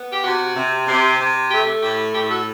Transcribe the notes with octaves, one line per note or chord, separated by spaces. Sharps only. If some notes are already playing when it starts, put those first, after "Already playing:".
Already playing: B3
G4
C3 F#4
C3
C3
C3
A3 G4
A2 G4
A2 G4
F#4 A4